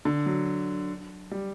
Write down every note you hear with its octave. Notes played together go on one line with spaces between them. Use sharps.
D3
F#3
G3